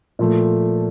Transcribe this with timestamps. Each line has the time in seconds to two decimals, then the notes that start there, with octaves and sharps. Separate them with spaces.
0.19 A#2 F3 A3